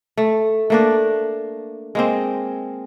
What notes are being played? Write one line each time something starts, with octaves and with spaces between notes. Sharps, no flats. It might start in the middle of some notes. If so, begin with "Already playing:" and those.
A3
A3 A#3 D4
G#3 A#3 C4